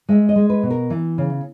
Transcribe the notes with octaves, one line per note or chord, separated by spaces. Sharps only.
G#3 E5
D#5
G#3
B4
B2
A#4
E3
C#3